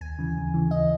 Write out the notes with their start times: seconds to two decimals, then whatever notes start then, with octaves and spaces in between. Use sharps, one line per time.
0.01 D#2 G#5
0.19 C#3 E3
0.36 D#2
0.54 C#3 E3
0.71 D#2 D#5